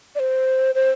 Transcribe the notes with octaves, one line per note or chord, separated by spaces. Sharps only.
D5
C5
C5